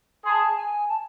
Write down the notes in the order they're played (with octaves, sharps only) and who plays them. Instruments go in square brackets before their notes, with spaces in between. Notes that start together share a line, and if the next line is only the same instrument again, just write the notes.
[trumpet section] G#4 [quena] C6
[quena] A5
G#5
A5